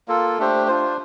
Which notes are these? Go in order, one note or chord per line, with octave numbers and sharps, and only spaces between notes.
A#3 F4 A4
A3 D4 G4 C5
D4 F4 C5